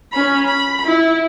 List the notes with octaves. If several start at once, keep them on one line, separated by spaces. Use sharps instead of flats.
C#4 B5
B5
E4